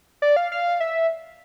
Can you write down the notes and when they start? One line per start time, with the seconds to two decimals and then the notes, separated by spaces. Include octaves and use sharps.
0.22 D5
0.36 F5
0.52 F5
0.80 E5